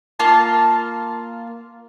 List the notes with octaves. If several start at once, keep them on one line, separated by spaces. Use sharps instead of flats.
A#3 F4 A5